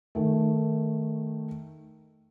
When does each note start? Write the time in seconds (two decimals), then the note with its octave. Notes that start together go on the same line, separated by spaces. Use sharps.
0.15 D#3 A3